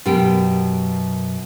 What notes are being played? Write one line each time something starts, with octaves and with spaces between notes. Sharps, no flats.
F#2 B2 G4 A#4 G5